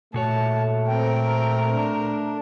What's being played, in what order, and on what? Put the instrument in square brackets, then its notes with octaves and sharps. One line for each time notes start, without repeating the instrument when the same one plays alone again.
[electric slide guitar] A#2 F#4 C#5 [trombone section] A3 [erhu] A5
[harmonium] C4 G5 [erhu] A#4
[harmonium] D4